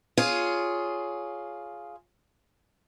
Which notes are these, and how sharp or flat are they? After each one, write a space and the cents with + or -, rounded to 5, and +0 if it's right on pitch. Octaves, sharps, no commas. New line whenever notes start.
F4 +0 G#4 +10 C#5 +15